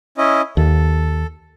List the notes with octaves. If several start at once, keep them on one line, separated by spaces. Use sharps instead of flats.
C#4 E4 D#5
D#2 A4